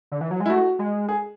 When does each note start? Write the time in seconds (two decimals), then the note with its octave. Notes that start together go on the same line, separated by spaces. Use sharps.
0.12 D3
0.21 E3
0.31 F#3
0.40 G#3
0.46 E4
0.50 A3 F#4
0.79 G#3
1.09 G#4